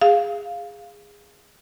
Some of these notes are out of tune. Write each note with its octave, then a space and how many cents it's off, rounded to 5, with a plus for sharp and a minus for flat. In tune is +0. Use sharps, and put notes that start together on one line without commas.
G#4 -15 F5 +0